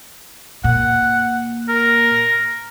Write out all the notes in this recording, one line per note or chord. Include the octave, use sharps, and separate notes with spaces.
A#2 F#5
A#4